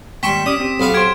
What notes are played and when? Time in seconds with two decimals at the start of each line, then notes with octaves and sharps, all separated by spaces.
0.23 D#2 G#2 G3 G5 C6 C#6 B6 E7
0.46 C#4 G4 D5 D#6
0.60 C4 G4
0.80 B1 B3 F5
0.94 G4 C5 F6 G#6 D7